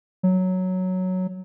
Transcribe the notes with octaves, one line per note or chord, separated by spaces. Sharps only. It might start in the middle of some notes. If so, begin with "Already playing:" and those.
F#3